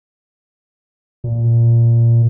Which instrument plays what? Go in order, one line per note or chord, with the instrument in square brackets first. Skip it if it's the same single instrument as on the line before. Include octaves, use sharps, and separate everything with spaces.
[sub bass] A#2